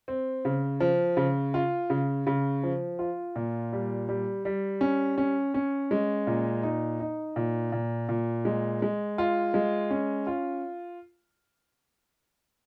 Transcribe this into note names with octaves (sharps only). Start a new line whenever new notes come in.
C4
C#3
F3
C#3
F4
C#3
C#3
F3
F4
A#2
G3
G3
G3
C#4
C#4
C#4
G#3
A#2
D#4
D#4
A#2
A#2
A#2
G#3
G#3
F4
G#3
C#4
F4